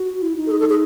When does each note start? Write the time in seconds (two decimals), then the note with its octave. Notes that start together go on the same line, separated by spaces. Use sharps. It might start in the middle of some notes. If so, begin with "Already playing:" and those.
Already playing: F#4
0.22 E4
0.36 D#4
0.47 A4
0.51 G#4
0.60 A4
0.69 G#4